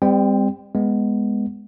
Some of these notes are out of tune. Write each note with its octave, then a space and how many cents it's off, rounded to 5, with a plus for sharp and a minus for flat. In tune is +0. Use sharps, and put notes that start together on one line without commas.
G3 +35 C4 -25 G5 +10
G#3 +0 B3 +0